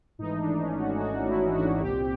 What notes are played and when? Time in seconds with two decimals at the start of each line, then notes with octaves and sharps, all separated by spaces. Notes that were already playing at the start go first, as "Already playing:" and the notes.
0.18 G#1 G#2 E3 A3 D#4
0.39 D4
0.60 C#4
0.79 F#4
1.00 F#4
1.27 E4
1.54 F#4
1.81 C2 A#2 G3 C4 G4